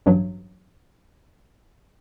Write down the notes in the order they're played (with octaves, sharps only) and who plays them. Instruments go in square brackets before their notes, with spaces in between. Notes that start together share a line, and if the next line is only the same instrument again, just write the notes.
[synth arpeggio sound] A1 G2 F#3